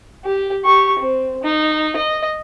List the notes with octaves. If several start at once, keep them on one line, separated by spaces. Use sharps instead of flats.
G4
G4 C#6
C4
D#4
D#5